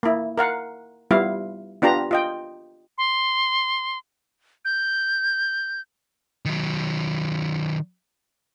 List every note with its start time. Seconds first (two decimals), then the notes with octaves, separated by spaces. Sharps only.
0.03 A#3 E4
0.38 A#4 F5 F#5
1.11 G3 B3 E4 F4 F5
1.82 B3 D4 F4 G4 A#5
2.11 F4 D#5 G5
2.98 C6
4.65 G6
6.45 D#3 F#3